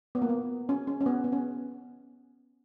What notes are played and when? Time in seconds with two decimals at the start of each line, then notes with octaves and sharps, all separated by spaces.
0.15 B3
0.22 A#3
0.29 B3
0.69 C#4
0.87 C#4
1.01 C#4
1.06 B3
1.24 B3
1.32 C#4